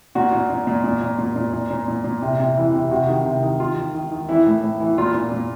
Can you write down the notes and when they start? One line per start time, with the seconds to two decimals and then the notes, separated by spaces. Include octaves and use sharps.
0.15 A#2 F#4
0.32 A#2
0.50 A#2
0.67 A#2
0.84 A#2
1.01 A#2
1.18 A#2
1.36 A#2
1.53 A#2
1.71 A#2
1.88 A#2
2.04 A#2
2.22 C3
2.40 C3
2.57 E3
2.74 C3
2.91 C3 F#4
3.08 D#3
3.26 C3
3.43 D#3
3.60 D#3 F4
3.77 D#3
3.95 D#3
4.11 D#3
4.28 E3 E4
4.46 A2
4.64 A2
4.80 E3
4.98 A#2 F4
5.14 A#2
5.32 A#2